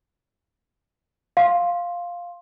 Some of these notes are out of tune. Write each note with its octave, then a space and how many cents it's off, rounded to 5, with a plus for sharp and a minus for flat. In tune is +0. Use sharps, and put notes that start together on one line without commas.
F5 +0 C6 +10